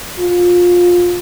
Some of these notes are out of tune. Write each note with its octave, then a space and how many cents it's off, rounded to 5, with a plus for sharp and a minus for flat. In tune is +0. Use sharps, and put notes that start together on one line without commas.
F4 +20